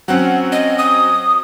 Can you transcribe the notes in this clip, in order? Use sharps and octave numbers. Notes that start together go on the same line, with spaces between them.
F#3 C4 C#4 F#5
D#5
D#6